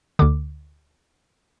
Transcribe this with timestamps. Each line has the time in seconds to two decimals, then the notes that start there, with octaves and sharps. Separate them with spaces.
0.19 D2 D3 D6